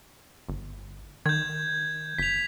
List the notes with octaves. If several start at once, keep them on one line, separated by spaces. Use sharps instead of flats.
G1
D#3 G6 G#6
G1 B6 F7